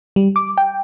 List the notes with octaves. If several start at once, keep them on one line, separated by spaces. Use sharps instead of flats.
G3
D6
G5